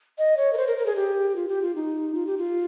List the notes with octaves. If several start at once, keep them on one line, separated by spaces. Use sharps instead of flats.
D#5
C#5
A#4
C5
A#4
A#4
G#4
G4
F4
G4
F4
D#4
F4
G4
F4